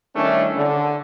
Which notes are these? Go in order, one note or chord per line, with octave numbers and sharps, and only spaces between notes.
D#3 G3 A3 C#4 D4 E4
D3